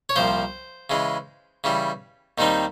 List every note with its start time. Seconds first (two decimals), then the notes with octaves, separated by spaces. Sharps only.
0.09 C#5
0.16 C2 A#2 F3 C5
0.90 C#3 E3 G#3
1.64 C#3 E3 G3
2.38 D#2 D#3 G3 C4 D#4